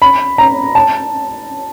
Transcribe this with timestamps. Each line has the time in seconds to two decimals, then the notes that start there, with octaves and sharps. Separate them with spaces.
0.02 B5
0.38 A#5
0.75 A5